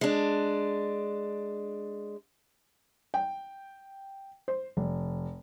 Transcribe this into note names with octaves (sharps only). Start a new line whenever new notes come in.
G#3 D4
G5
C5
F1